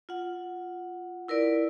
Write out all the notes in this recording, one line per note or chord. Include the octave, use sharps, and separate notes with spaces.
F4 F#5
E4 A#4 B4 D5